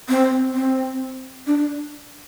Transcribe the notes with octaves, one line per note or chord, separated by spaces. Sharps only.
C4
C4
D4